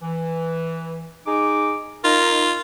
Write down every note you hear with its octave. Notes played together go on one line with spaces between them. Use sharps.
E3
D#4 G#4 D6
D#4 F4 A#4